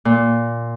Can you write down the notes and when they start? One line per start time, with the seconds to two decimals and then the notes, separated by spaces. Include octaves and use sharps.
0.05 A#2